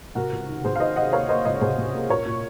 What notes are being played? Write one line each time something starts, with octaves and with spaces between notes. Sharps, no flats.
C3 F#4 A#4
C#2
D#3
C3 G#4 C5
F5
D#3 C5 D#5
D#3 D#5 F#5
A#3 C#5 F5
A#3 C5 D#5
C#2 C5 D#5
C3 G#4 C5
C3
A#3
A#2 A#4 C#5
A#2